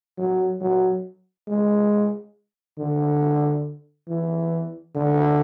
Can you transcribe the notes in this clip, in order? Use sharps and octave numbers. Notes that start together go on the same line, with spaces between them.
F#3
F#3
G#3
D3
E3
D3